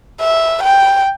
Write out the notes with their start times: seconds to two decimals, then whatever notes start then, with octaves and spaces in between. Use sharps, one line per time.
0.21 E5
0.63 G5